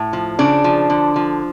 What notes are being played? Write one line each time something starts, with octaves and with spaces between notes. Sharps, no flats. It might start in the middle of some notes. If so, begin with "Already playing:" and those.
Already playing: A2
F3
C#3 D4
F3
D3
F3